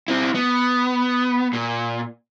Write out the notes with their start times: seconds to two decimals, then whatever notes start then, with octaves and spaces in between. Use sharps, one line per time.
0.08 C4 E4
0.35 B3
1.53 A#2